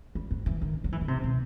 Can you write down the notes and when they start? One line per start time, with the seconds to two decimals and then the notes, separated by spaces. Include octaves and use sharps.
0.15 G3
0.31 F#3
0.46 E3
0.62 D#3
0.84 F#3
0.92 E3
1.01 D#3
1.08 C3
1.24 B2